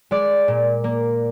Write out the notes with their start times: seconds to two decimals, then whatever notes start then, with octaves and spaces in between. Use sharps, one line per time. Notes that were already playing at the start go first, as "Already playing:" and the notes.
0.11 G#3 D5
0.48 A#2
0.84 A#3